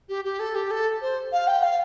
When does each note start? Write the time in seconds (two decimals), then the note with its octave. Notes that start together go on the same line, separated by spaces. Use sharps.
0.09 G4
0.24 G4
0.40 A4
0.55 G4
0.71 A4
1.02 C5
1.32 F5
1.47 G5
1.63 F5